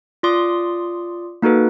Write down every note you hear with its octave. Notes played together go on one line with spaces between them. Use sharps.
F4 D5 C6 D6 D#6
A#3 D#4 F#4 A4 B4